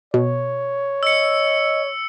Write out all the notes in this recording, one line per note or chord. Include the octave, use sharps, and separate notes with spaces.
B2 C#5
D#5 E6 C#7